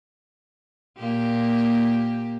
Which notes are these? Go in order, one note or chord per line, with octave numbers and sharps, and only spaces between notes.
A#2 A#3 G4